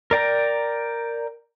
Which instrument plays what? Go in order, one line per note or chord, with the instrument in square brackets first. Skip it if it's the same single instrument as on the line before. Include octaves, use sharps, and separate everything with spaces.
[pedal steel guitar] A#4 D5 G5 A#5